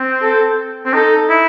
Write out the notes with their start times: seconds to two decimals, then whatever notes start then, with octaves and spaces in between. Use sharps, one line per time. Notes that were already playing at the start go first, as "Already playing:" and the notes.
Already playing: C4
0.22 A4
0.85 C4
0.93 D#4 A4
1.29 E4